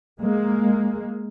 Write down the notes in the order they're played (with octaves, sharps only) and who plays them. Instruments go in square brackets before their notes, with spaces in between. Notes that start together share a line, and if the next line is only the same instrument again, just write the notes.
[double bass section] G#3 A#3